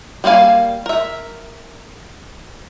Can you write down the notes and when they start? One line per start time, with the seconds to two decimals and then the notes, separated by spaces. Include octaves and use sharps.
0.24 G3 A#3 E4 F5 G#5
0.86 A#4 E5